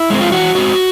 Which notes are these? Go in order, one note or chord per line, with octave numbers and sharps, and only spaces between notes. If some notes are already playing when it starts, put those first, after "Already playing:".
Already playing: E4
G#3 C4
F4
E3 F#4
G#3 C4 F#4